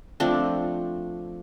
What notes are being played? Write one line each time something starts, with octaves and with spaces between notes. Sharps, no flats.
F3 A3 C4 D4